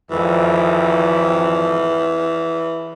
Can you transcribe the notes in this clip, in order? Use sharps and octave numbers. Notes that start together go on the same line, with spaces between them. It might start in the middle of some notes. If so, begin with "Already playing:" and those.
G#1 F2 E3